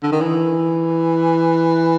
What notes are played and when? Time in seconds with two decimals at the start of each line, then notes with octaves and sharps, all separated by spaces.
0.03 D3
0.12 D#3
0.21 E3